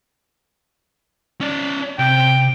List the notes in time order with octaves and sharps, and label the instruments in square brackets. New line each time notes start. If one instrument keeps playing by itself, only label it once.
[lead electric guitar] C#4 D5
[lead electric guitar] C3 [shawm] G5